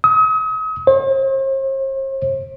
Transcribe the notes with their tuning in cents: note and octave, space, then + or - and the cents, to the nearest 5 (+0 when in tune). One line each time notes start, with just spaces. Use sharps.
D#6 +40
C5 +45